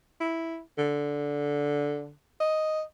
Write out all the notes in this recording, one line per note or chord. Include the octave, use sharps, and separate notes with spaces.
E4
D3
D#5